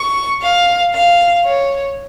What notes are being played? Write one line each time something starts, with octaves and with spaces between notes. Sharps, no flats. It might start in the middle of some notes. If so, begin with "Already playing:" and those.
Already playing: C#6
F5
F5
C#5